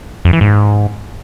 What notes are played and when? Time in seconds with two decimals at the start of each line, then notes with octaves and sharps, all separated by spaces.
0.25 F2
0.33 E3
0.41 G#2